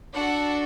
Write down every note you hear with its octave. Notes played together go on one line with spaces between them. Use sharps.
D4 F#4 A4 F#5